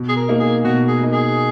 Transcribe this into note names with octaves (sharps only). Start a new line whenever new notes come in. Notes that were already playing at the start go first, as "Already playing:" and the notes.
Already playing: B2
G#4
A#4
A#3 D#4
G#4
B2 F#4
G#4
A#3 D#4
G#4